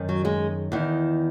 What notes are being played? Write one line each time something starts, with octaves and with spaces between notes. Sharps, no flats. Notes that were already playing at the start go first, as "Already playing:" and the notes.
Already playing: F#2 D#3
F#3
G#3
E2 D#3